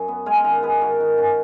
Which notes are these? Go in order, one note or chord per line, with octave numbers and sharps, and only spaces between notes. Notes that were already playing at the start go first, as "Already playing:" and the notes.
Already playing: F#2 D#5
B3
G#3 F5 G#5
D#3 F#5 A#5
B3 G#4 B4
D#3 F#4 A#4
D#3
C#4